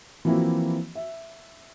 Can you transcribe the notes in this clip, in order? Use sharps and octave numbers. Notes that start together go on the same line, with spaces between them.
E3 F3 A#3 C4 E4 F#4
E5